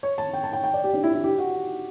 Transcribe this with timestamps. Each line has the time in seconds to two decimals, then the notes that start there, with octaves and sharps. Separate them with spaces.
0.03 C#5
0.18 A5
0.33 G5
0.44 A5
0.53 G5
0.64 G5
0.74 D5
0.84 G4
0.93 D4
1.03 E4
1.14 E4
1.24 G4
1.38 F#4